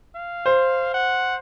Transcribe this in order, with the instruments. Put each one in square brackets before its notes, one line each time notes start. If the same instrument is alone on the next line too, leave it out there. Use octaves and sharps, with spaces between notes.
[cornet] F5
[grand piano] C5
[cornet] F#5